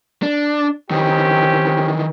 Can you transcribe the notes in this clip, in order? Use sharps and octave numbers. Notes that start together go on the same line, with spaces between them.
D4
D#3 E3 C4 C#4 G4